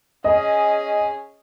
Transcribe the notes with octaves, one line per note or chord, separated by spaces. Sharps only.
C#4 G#4 D#5